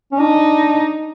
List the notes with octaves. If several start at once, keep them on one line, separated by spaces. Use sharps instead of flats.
C#4
D4 D#4